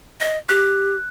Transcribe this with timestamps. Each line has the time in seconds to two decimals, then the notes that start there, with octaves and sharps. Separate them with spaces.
0.21 D#5
0.49 G4 F#6